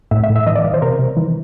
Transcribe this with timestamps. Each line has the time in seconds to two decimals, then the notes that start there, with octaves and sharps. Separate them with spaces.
0.11 A2 E5
0.24 E5
0.30 A2
0.36 E5
0.47 E3 D#5
0.55 D5
0.64 E3 F5
0.74 C5
0.82 C3 A#4
0.99 C3
1.17 E3